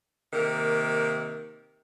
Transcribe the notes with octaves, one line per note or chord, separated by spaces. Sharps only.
C3 D#3 A#3